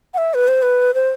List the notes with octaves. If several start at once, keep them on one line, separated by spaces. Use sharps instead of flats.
F#5
E5
B4
C5
B4
C5